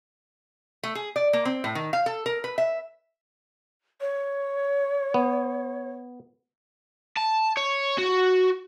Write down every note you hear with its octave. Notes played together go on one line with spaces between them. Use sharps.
A3
G#4
D5
A#3
C4
A2
D#3
F5
A4
A#4
B4
E5
C#5
B3
A5
C#5
F#4